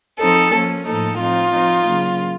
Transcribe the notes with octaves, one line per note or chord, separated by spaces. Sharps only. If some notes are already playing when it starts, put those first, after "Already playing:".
F3 C4 D#4 A4
F3 A#3 C#4
A2 F3 A#3 D#4 A4
F3 C4 D#4 F4
F3 C4 D#4
C#3 F#3 A#3